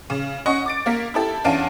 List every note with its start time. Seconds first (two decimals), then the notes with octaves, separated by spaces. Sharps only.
0.10 C#3
0.46 C#4 D#5 F#5 C#6
0.66 D6 A6 D7
0.86 A#3 A#4 B6
1.14 E4 G4 A4
1.44 E2 C#4 D4 F5 A5 D7